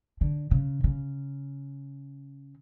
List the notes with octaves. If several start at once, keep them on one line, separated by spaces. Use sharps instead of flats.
D3
C#3
C#3